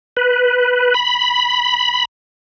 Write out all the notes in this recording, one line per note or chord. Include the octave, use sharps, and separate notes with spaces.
B4
B5